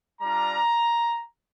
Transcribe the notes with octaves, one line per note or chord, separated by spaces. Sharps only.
G3 D4 F4 A#5